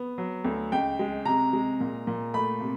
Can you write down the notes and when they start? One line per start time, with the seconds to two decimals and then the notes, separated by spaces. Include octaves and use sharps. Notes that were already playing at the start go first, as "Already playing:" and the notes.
Already playing: B3
0.18 F#3
0.45 D2
0.72 C#2 G5
0.99 G#3
1.25 C3 A#5
1.53 G#3
1.81 A#2
2.07 A#2
2.34 A3 B5
2.61 C3